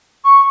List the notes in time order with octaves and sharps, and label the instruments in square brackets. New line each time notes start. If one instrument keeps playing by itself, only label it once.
[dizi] C#6